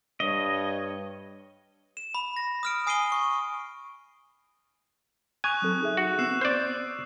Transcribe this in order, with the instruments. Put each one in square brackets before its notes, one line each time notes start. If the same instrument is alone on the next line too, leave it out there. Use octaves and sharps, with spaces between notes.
[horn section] G2 C#5 [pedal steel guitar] D#5
[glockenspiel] E7
B5
A#6
D#6 F6 D7
G#5 D#6 C7 D7 D#7 G7
C#6
[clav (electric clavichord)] G#5 [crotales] C#6 D#6 F#6
[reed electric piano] F#3 C4 A4
D#4 G#4 E5
[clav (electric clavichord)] F#4 [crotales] F#6
[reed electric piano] B3 C4 [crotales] E6 C7 E7
[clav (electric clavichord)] C5 D5